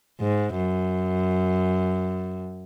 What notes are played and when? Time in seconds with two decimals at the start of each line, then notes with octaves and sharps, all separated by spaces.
0.20 G#2
0.57 F#2